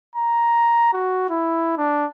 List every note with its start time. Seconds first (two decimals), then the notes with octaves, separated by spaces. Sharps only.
0.16 A#5
0.93 F#4
1.30 E4
1.77 D4